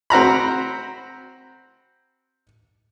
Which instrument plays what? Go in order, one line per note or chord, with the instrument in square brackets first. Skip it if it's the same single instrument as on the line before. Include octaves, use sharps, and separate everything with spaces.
[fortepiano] C4 F#4 A#5 B5